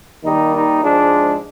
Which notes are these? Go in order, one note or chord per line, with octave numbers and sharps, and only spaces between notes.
D#2 D#3 G3 D#4
D#4
G#2 F3 G#3 D4